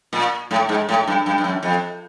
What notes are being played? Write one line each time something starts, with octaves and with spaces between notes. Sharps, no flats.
A#2
A2
G#2
A2
G2
G2
G2
F#2
F2